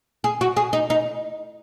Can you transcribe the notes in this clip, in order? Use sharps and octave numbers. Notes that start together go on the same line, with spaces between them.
G#4
F#4
G#4
D#4
D#4